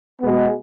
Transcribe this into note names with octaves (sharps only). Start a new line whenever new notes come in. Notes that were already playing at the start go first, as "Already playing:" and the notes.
B2 G#3 B3